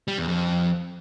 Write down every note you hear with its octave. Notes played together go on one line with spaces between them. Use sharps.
G3
E2
F2